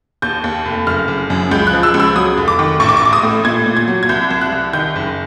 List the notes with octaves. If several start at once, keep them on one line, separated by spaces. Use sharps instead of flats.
D#2 G6
D#2
F1
F#1 F6
F#1
F#2
C#2 G6
F#6
F3
E6
C#2
E6
F#3 D#6
F1
D6
D#3
A1 C#6
D6
C#6
A1 D6
D#6
A2
A#2 G#6
A#2
G#6
F#3
G#6
C2 G6
C2
F#6
C2
D#3 G6
F#1